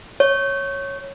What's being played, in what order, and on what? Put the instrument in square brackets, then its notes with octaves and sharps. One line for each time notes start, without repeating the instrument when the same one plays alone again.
[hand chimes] C#5